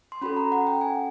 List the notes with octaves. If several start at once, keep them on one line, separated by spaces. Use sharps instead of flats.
C6
C#4 F#4 A4 B5
A#5
F#5
G5
G#5